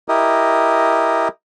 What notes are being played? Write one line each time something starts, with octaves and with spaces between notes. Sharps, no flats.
E4 G4 A#4 D#5